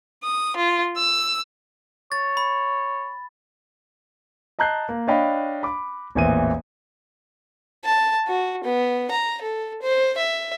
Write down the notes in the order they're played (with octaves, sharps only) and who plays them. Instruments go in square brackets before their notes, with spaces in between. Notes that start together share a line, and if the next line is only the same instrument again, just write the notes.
[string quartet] D#6
F4
E6
[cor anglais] C#5 [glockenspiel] A6
[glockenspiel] B5
[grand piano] D#5 A5 A#5 F#6 G6 C7
A#3
D4 C#5 D#5 F5 G5 B5
B5 D6
A1 E2 A#2 E3 C5 D#7
[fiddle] A5
F#4
B3
A#5
A4
C5
E5